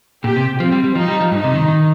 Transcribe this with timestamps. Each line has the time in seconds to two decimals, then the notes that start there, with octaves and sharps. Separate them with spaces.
0.24 A#2 G4
0.36 C3
0.60 F3 C4
0.72 G3
0.84 G3
0.95 F3 D#4
1.08 G3
1.21 F3
1.31 G2 D#4
1.44 C3
1.55 D#3
1.68 D#3